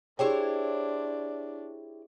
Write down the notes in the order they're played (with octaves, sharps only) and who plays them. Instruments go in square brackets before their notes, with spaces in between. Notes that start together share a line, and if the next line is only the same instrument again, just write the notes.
[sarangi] D4 [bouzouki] E4 C5 C#5 [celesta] G4 G#4 G5